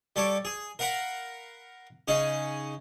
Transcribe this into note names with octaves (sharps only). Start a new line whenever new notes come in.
G3 A4 C#5 D6
G#4
A#4 F5 F#5 A#5 B5
C#3 C#4 D#4 G#4